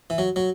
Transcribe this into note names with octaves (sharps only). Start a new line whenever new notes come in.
E3
F#3
F#3